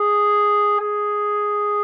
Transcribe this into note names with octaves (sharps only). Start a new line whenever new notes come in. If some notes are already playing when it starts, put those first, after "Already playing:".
Already playing: G#4
G#4